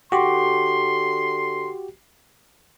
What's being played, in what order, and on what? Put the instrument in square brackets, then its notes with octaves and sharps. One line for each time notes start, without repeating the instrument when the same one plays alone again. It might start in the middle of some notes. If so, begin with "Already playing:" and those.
[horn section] D3 C6 [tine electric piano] F#4 G4